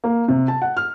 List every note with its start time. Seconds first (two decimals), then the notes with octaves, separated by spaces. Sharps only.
0.04 A#3
0.28 C3
0.48 A5
0.62 F#5
0.77 F6